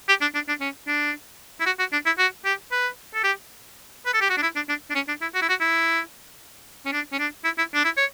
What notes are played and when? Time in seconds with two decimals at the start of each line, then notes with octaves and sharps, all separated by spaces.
0.08 G4
0.21 D4
0.34 D4
0.48 D4
0.60 C#4
0.87 D4
1.60 E4
1.66 F#4
1.79 F#4
1.92 D4
2.06 E4
2.18 F#4
2.45 G4
2.72 B4
3.14 A4
3.24 G4
4.06 B4
4.14 A4
4.21 G4
4.30 F#4
4.37 D4
4.42 E4
4.56 D4
4.69 D4
4.90 D4
4.95 C#4
5.08 D4
5.21 E4
5.34 F#4
5.42 E4
5.49 F#4
5.60 E4
6.85 C#4
6.92 D4
7.12 C#4
7.19 D4
7.44 E4
7.58 E4
7.74 D4
7.84 E4
7.97 C#5